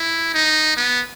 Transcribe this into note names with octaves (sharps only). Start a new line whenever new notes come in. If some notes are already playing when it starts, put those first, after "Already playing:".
Already playing: E4
D#4
B3